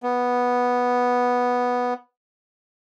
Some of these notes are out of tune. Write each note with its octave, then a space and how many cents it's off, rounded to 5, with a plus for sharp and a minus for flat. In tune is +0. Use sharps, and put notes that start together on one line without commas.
B3 -5